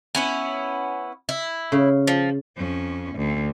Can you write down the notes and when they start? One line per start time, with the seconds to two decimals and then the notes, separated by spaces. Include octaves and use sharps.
0.15 B3 C#4 E4
1.29 E4
1.72 C#3
2.07 F3
2.57 F2 C#4
3.16 D2